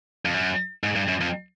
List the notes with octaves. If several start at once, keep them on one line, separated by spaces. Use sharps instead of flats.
F2
F#2
G#2
G2
F#2
F2